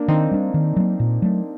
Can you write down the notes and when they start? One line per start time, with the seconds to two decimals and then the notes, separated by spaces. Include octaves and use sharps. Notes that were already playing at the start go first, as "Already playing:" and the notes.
Already playing: A#3 D4
0.08 D#3 C4 D#4
0.31 G3 D4
0.54 D#3
0.76 F#3 A#3
1.00 A#2
1.22 F#3 A3